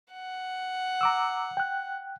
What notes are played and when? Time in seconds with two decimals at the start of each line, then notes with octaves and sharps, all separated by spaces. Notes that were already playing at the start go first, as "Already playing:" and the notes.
0.13 F#5
1.01 A#5 D6 E6
1.57 G5 F#6